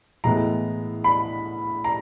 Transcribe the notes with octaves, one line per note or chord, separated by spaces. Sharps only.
A2 E3 G#3 B3 A#5
B5
A#5